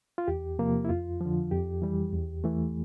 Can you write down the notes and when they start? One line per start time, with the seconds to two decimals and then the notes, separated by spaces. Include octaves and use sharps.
0.18 F4
0.28 E2 G4
0.59 C3 F3 A#3
0.85 E4
0.89 F2 F4
1.21 D3 F3
1.51 F2 G4
1.82 E3 G3
2.13 E2
2.44 E3 A3